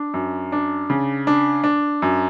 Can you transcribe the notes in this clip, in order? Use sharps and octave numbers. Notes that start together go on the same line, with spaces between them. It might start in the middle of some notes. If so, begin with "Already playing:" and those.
Already playing: D4
F#2
D4
C#3
D4
D4
F#2